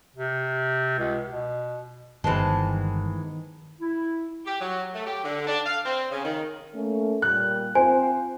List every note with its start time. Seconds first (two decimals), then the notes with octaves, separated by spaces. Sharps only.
0.16 C3
0.99 C#2
1.28 B2
2.24 G1 D#3 E3 G#3 B3 C5 A5
3.80 E4
4.46 G4
4.60 F#3
4.93 A3
5.05 G4
5.24 D3
5.47 D4
5.65 F5
5.85 C4
6.10 C#3
6.24 D#3
6.73 A3 A#3 C#4
7.22 A#2 G3 F#6
7.75 C4 F4 C5 G#5